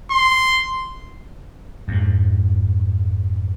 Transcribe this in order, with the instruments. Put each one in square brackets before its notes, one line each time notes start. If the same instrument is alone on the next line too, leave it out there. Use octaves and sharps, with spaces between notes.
[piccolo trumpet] C6
[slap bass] F2 G#2